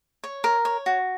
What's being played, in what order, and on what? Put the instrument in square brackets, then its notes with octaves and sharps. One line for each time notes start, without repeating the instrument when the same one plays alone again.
[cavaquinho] C#5
A#4
C#5
F#4